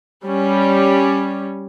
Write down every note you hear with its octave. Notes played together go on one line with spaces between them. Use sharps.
G3 C#4